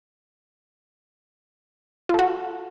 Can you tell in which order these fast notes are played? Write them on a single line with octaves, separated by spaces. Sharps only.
F4 A4 F#4